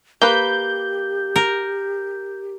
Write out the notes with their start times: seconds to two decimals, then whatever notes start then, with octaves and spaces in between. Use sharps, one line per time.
0.22 A#3 G4 B4 G6
1.36 A#4